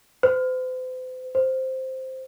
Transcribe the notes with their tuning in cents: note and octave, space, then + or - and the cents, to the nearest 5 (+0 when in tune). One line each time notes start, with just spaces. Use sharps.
C5 -40
C5 +0